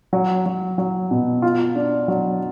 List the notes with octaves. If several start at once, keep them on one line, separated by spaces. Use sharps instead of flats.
F#3
F#3
F#3
B2
F4
D4
F#3